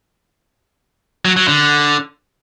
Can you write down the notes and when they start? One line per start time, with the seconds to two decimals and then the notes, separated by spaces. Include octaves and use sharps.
1.25 F#3
1.36 F#3
1.48 D3